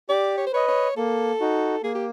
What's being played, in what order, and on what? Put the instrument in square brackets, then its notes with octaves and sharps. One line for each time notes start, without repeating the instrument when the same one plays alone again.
[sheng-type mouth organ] G4 [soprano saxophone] D5
[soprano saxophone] C#5
C5
[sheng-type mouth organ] B4 D#5 [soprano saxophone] C#5
[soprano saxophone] C#5
[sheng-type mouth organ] A#3 [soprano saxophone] A4
[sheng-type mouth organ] D#4 F#4
[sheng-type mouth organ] A#3 [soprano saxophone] G#4
[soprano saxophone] G4